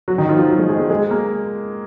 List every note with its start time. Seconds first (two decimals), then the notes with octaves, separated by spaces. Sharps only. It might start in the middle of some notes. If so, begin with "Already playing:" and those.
0.08 F#3 F#4
0.18 D#3 D#4
0.29 F3 F4
0.34 F#4
0.39 F3 F4
0.48 F#3 F#4
0.59 G#3 G#4
0.69 G#3 G#4
0.79 G#3 G#4
0.90 G#3 G#4
1.10 A#3 A#4